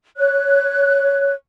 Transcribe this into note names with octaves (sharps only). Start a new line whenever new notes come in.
C#5 F#6